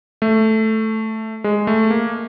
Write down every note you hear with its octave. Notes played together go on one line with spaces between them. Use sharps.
A3
G#3
A3
A#3